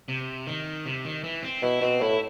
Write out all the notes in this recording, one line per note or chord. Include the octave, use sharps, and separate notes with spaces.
C3
D#3
C3
D#3
E3
C4
B2 E4
B2 C4
A2 E4